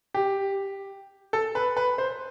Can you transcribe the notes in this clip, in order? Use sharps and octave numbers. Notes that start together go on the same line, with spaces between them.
G4
A4
B4
B4
C5